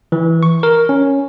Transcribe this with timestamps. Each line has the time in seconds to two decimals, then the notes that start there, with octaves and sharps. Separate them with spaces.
0.12 E3
0.43 C#6
0.63 A#4
0.89 C#4